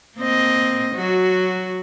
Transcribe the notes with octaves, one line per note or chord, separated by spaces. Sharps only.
A#3 C4 D#5
F#3 F#4